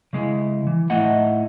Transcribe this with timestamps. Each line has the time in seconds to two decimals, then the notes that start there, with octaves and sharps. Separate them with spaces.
0.13 C#3 G#3 E4
0.67 E3
0.90 A2 A3 D#4 E4 D#5 F#5